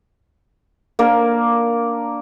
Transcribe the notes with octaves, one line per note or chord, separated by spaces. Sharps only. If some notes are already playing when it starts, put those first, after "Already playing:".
A#3 D4 A#4